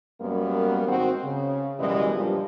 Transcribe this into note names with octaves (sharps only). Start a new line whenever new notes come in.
F#2 G3 A#3 B3
G#2 D#3 C4 F#4
C#3
F#2 B2 E3 G3 G#3 D#5
G2 A#2 F3 G3